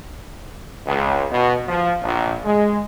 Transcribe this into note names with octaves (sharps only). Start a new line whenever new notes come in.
C#2
B2
F3
A#1
G#3